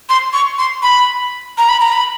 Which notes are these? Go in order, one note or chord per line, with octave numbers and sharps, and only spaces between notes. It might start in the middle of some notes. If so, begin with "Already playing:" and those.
C6
C#6
C6
B5
A#5
B5
A#5
B5